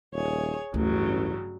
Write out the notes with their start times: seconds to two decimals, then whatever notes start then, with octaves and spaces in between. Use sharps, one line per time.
0.13 D#1 G#4 C#5
0.74 A1 D2 G2 C#3 F#3